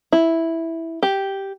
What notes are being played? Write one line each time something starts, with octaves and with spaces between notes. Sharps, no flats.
E4
G4